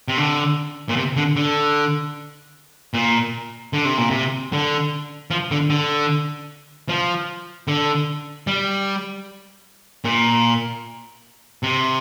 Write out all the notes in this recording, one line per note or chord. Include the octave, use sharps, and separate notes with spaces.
C3
D3
A#2
C3
D3
D3
A#2
D3
C3
A#2
C3
D3
F3
D3
D3
F3
D3
G3
A#2
C3